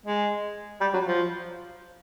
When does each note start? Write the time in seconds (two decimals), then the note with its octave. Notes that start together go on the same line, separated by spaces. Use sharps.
0.06 G#3
0.81 G3
0.93 F#3
1.06 F3